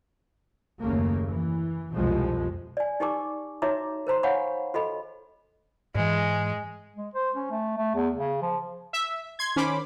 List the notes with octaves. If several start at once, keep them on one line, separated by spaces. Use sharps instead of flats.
F#1 D#2 C#3 A3 A#3
E3
C2 F2 B2 F3 G#3
D5 G#5
D#4 G4 A#4 G#5 C#6 D6
D#4 F#4 C#5 E5 A#5 D6
A#4 C5 A#5 C6
C#5 F5 F#5 G#5 B5 C#6
F#4 A4 D#5 B5
G#2 E3 G#3
G#3
C5
C#4
A3
A3
E2
C#3
F3
E5
C6 G#6
D#3 C#4 C5 B5 D6